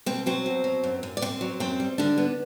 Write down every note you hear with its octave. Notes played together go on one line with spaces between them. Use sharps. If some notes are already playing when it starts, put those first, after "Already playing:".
B2 C4 C5
F#3 C4 C5
B2
F#3
F#2
F#2
D5
F#2 C4 C5
F#3
F#2 C4 C5
G3
D3 G3 D4
B3